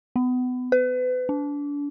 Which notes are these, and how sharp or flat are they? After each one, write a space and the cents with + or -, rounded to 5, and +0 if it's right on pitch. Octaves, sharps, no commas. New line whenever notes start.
B3 +25
B4 +35
D4 -30